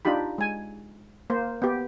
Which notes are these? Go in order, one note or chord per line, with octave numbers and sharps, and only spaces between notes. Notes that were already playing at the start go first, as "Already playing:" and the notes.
D4 D#4 F4 G4 B5
G#3 G#5
A#3 C5
B3 G4